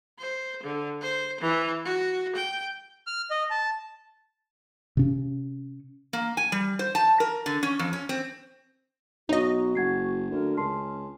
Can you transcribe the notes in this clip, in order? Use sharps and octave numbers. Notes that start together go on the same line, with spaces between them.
C5
D3
C5
E3
F#4
G5
F6
D#5
A5
C3 C#4
A#3
G#5
G3
C5
A5
A#4
D3
C#4
F2
C#4
C4
B1 D#4 F#4 C#5 D#5 A#5
F#1 F#5 G#6 C7
D2 A#4
C#2 C#4 A5 C6 C7